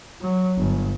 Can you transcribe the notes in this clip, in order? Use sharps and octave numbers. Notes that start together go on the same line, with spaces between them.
F#3
G1